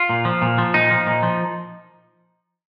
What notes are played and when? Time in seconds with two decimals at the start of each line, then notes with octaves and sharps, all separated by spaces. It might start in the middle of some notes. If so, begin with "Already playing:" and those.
Already playing: F4
0.09 A#2
0.25 F3
0.42 A#2
0.58 F3
0.74 A#2 D#4
0.91 F3
1.07 A#2
1.23 F3